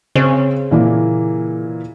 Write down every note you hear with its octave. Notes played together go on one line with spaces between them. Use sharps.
C#3 C4
A#2 E3 A#3